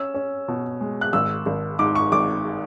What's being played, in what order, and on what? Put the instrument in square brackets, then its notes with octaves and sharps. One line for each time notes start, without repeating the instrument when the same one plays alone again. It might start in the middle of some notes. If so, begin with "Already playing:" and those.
Already playing: [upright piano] C#4 E6
C#4
B2
G#3
F#6
G#1 E6
G#1
G#2 D6
C#6
G#1 D6